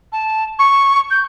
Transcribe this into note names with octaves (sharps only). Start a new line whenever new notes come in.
A5
C#6
G6